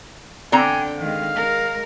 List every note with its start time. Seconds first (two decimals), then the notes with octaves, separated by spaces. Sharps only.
0.52 D3 C4 D4 G5 G#5 A#5
1.00 D#3 G#3 F5
1.36 G#3 A#4